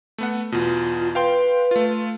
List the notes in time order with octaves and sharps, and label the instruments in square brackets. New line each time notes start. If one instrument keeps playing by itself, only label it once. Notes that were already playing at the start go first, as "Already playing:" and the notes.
[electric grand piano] A3 B3 F#5
[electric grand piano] E2 B2 [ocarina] F4
[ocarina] B4 [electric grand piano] F5 G5 C6
[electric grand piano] A3 F4